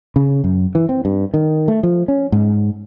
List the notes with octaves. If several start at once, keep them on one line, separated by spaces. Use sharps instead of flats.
C#3
F#2
E3
C4
G2
D#3
A3
F3
C#4
G#2